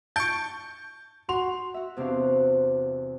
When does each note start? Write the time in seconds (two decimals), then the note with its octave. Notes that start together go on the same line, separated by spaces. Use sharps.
0.16 A5 C#6 G6 D7
1.29 F#4 C6 F7
1.74 F#4 E5
1.97 E2 C3 C4 D4 F#4 F5